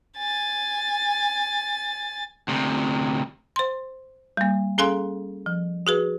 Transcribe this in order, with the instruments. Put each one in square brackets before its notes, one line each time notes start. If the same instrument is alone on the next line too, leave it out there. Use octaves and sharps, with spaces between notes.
[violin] G#5 A6
[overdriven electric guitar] D2 C3
[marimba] C5 C6
G3 A#3
C#4 G#4 A4 F5 G#5 C6
F3
F#4 G#4 B4